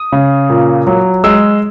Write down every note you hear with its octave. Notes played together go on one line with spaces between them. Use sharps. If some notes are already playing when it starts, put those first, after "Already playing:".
Already playing: D#6
C#3
A#2
F#3
G#3 E6